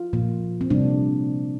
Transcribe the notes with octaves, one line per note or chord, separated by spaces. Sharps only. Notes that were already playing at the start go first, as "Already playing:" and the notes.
Already playing: F4
A#2 F3 A#3
C4
C3 G3 A#3 D4